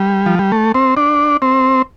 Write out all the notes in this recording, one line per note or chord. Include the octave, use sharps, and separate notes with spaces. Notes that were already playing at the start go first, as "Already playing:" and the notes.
Already playing: G3
F3
G3
A3
C4
D4
C4